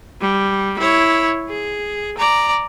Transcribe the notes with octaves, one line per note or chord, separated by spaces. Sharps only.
G3
E4 C#5
G#4
D5 A#5